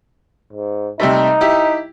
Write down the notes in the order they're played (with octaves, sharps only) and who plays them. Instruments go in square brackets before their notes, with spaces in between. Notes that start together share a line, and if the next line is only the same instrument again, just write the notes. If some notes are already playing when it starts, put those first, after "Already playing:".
[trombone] G#2
[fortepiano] C3 G3 A3 [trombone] D#4
[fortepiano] E4 G4